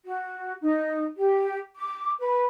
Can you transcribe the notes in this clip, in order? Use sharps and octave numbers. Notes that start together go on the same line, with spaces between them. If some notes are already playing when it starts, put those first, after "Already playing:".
F#4
D#4
G4
D6
B4